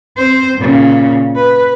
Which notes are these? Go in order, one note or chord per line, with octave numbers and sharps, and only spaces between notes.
C4 C5
A#2 C#3
B4